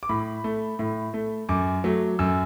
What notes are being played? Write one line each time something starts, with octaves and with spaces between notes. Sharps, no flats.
D6
A2 B5
A3
A2
A3
F#2 D6
F#3 A3
F#2 E6